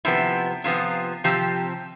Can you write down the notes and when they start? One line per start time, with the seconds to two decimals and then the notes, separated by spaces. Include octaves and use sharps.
0.05 C3 F3 B3 E4
0.64 C3 F3 B3 F4
1.24 C3 F3 C4 G4